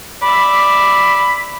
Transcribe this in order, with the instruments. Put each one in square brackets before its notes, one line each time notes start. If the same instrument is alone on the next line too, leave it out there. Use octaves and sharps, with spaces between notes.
[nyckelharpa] D5 E5 [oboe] B5